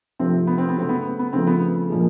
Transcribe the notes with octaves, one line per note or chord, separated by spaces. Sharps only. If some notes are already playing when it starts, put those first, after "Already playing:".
C3 F3 A3 C4
B3
C4
B3
C#3 F#3 A3 C4
B3
B3
B3
C#3 F3 A3 C4
B3
A#2 F3 G#3